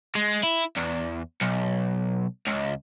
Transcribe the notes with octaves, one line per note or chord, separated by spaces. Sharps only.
G#3
E4
E2
B1
C#2